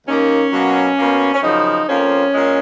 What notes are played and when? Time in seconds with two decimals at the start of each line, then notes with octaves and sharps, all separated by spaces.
0.07 D#2 D#3 A#3 C#4
0.52 B2 F#3 A#3
0.97 B2 A#3
1.34 C#4
1.42 F#2 C#3 F3 D#4
1.88 F2 F3 A#3 C#4
2.33 A#2 G#3